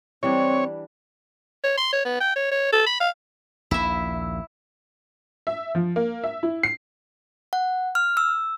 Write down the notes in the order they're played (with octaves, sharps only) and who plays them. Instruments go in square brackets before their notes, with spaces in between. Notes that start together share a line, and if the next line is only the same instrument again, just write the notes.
[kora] E3 G3 D4 [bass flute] C4 [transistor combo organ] C#5
[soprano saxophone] C#5
C6
C#5
B3
G5
C#5
C#5
A4
B5
F5
[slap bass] A#1 D#2 A#2 [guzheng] E4 E5
[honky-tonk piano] E5
F3
A#3
E5
E4
C7
[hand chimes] F#5
F6
E6